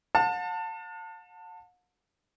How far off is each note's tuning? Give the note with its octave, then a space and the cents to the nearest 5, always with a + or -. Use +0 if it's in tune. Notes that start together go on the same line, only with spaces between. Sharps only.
F#5 -45 A5 +25